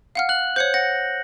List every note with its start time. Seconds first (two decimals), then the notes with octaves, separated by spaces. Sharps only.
0.15 F5 F#5 F6
0.29 F#6 F#7
0.56 C5 C#5 G6 C#7
0.74 F#5 A#6